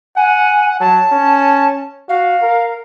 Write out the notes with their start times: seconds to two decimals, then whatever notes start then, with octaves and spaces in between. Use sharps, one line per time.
0.16 F#5 G#5
0.80 F#3 A5
1.12 C#4
2.09 F#4 F5
2.42 A#4